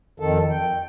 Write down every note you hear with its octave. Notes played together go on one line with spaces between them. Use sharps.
F2 D#3 A4
G5